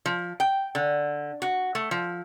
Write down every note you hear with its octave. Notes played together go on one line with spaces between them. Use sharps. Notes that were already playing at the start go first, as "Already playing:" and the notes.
F3
G5
D3
F#4
A3
F3